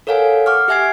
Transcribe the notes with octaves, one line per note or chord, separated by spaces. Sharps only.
A4 A#4 C#5 F5 F#5 G#5
F#5 C#6 D6 F6
G4 E5 F#5 G#5 G#6 C7